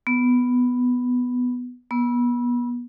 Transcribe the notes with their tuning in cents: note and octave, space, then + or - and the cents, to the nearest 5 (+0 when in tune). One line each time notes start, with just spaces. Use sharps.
B3 +5
B3 -30